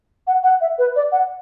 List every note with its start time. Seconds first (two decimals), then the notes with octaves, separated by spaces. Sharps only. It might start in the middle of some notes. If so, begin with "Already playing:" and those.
0.27 F#5
0.44 F#5
0.61 E5
0.78 B4
0.96 D5
1.12 F#5